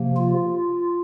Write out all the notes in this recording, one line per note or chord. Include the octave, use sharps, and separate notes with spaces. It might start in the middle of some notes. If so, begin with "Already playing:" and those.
Already playing: C3 F3 A#3
F4